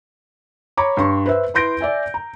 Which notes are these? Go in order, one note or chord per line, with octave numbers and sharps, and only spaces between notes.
C#5 A#5 B5 D6
G2 C6 C#6
B4 C5 E5
E4 B4 C6 G6 A#6 D7
D5 E5 G#5
A#5